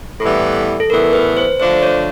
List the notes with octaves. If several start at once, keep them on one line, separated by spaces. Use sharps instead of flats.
A2 E3 G3 B3 A4
A4
A2 E3 G3 B3 A#4
B4
C5
D3 F3 A3 D4 C5
C#5